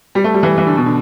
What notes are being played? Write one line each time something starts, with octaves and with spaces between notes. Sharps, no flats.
G3
A3
G3
E3
E3
D3
B2
D3